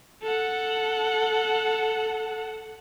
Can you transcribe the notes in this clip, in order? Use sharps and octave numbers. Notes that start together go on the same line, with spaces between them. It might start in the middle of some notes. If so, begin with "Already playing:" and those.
A4 F#5